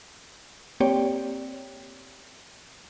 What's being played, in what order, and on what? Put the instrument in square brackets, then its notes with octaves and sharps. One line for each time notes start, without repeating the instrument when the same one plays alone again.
[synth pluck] A#3 C4 G4 C#5 D5 G5